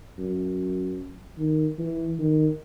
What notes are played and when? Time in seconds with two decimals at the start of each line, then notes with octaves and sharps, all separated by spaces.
0.18 F#2
1.38 D#3
1.79 E3
2.19 D#3